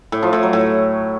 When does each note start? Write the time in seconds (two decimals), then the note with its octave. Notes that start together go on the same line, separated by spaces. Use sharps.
0.12 A2
0.22 F3
0.33 A2
0.43 F#3
0.53 A2